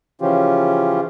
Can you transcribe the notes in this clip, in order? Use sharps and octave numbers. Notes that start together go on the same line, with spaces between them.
C#3 E3 F3 C#4 F4 G4